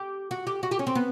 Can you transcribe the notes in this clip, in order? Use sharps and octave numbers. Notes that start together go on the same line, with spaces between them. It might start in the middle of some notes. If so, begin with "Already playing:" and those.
Already playing: G4
F#4
G4
F#4
G4
C#4
C4
B3